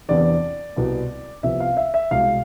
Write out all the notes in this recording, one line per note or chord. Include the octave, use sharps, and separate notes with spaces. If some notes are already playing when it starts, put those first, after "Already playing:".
E2 C3 E3 B3 D4 D5
C2 B2 B3
C2 C3 F3 B3 E5
F5
E5
E5
C2 B2 G#3 F5